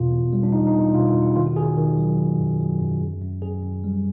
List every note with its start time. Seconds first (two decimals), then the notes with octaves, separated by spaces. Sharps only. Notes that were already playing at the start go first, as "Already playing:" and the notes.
Already playing: E2 B2 F4
0.11 E2
0.33 G3
0.43 D4
0.52 E2 D#4
0.67 D#4
0.74 E2
0.81 E4
0.94 B2 F4
1.07 F4
1.14 E2
1.22 E4
1.35 D#3 F4
1.47 F#4
1.56 D#3 G#4
1.77 D#3
1.98 F#3
2.18 D#3
2.39 F#2
2.59 F#3
2.81 F#2
3.02 F#2
3.22 F#2
3.42 F#2 G#4
3.63 F#2
3.84 G3